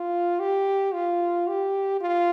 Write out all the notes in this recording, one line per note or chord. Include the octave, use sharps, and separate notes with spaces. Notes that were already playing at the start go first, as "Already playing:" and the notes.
Already playing: F4
G4
F4
G4
F4